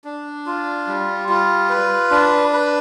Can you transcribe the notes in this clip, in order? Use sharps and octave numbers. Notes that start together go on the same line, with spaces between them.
D4
F4
G3
F4
B4
D4
B4